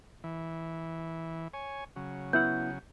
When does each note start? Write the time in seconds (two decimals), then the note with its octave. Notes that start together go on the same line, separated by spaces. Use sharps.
0.24 E3
1.54 C#5 G#5
1.96 C#3 F#3
2.33 B3 E4 F#5 G6